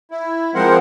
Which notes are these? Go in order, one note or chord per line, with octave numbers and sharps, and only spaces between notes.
E4
F3 G#3 C4 A#4 C5 F#5